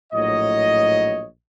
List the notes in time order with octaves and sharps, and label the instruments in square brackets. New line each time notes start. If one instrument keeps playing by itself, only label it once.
[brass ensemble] A#1 A2 F#3 C#5 D#5